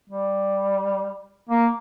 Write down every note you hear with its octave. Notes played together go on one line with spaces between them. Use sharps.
G3
A#3